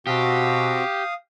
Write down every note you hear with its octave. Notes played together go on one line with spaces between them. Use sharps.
B2 C4 F#4 G4 F5 D#6